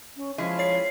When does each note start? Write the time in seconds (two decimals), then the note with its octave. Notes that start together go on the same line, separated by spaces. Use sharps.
0.16 C#4
0.38 F3 G#3 C#4 E4
0.59 C#5 C7